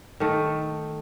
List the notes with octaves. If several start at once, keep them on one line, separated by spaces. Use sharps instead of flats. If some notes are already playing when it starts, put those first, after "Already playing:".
D#3 A3